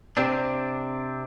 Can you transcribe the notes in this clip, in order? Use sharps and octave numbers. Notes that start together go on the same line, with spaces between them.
C3 C4 D4